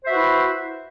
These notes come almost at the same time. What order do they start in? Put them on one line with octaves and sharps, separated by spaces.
C5 E5 F#4 B4 E4